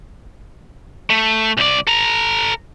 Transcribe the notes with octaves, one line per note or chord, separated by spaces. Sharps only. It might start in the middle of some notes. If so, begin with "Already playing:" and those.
A3
C2 D5
A4 A#5